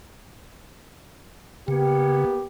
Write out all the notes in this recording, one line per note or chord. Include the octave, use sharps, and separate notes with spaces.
C#3 A#3 B3 G4